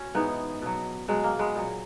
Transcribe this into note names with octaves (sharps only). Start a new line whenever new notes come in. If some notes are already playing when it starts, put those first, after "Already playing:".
Already playing: C#4 F#4
G#2 E3 B3 D#4
B2 F#3
B2 F#3 G#3
A#3
G#3 B3
A#2 F#3